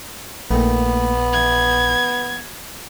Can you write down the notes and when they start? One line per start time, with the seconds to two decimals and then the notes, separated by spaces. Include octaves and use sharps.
0.51 A#1 A#2 D#3 A3 B3
1.33 E3 G#6